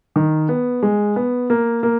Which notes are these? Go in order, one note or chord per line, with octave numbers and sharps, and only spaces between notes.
D#3
B3
G#3
B3
A#3
A#3